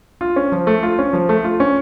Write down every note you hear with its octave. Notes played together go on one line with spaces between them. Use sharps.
F4
C#4
F3
A3
F4
C#4
F3
A3
F4
C#4